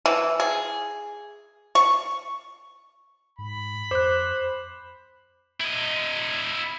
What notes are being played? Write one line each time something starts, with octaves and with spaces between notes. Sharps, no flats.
E3
G#4
C#6
G#2 B5
F2 C5 D6 F#6
E4 D#5